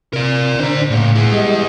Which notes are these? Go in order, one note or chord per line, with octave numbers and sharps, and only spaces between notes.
C3 A#4 D5
D3 D4 C5 A#5
A2 C#3 A#3
E4 G#4
G3 G#3 D#5